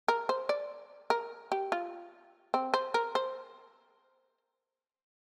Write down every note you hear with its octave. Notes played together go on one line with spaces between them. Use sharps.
A#4
C5
D5
A#4
G4
F4
C4
C5
A#4
C5